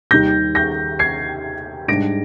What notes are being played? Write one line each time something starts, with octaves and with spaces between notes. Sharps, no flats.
D#2 D#3 G3 G6 A#6
G6 A#6
G#6 C7
G#2 G3 D4 A#6 D7